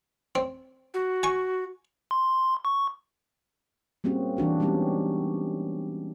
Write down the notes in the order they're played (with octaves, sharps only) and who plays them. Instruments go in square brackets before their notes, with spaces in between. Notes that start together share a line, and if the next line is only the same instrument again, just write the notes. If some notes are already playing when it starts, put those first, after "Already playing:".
[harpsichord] C4
[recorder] F#4
[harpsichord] G#5 C#6
[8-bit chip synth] C6
C#6
[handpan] G3 A#3 C4 C#4 F#4 G#4
E3 D4 F#4 A#4
G3 G#3 B3 C#4 D#4 G4